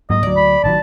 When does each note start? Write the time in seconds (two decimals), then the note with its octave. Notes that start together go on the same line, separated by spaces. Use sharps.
0.10 G#2 F#3 A#3 D#5
0.23 D2 F#3 D5
0.37 B5
0.64 A1 D#3 F#3 A5